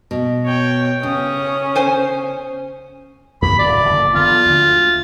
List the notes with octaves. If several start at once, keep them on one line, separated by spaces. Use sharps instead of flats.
B2
C#5 G5
C#3 C#4 D#6
C5 G#5
F2 A#3 B5
D1 D5
F#1 F3 A#3
D3 F3 B3 F4
D2